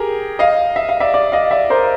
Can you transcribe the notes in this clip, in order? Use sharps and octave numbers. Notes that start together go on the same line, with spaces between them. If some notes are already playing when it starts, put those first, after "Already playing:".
Already playing: G4 G#4 A#4
D#5 F5
E5
F5
D5 E5
D5 E5
D#5 F5
D5 E5
A#4 C5